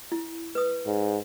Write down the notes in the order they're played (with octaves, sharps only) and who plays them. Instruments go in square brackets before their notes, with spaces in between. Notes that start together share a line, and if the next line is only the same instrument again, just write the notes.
[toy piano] E4
B4 D#6
[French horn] G#2